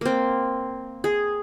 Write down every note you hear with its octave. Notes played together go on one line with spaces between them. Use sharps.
A#3 C4
G#4